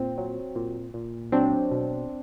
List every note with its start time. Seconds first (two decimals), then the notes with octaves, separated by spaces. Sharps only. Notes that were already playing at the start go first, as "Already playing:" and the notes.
Already playing: A#2 C4
0.18 F#3
0.55 A#2
0.94 A#2
1.32 F#3 C4 D4
1.71 B2